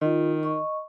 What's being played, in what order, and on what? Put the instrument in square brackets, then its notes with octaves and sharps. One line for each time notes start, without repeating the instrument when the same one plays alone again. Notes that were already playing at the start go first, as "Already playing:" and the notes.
[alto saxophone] D#3 [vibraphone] F4 D#5
[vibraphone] D#5 C#6